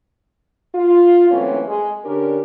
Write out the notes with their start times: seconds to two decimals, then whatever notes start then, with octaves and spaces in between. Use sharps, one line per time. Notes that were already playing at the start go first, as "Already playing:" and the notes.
0.74 F4
1.30 E3 F#3 A3 A#3 C4 C#4
1.67 G#3
2.05 D3 C#4 D4 G4 A#4